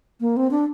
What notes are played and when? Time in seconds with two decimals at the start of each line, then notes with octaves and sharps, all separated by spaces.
0.20 A#3
0.37 C4
0.51 D4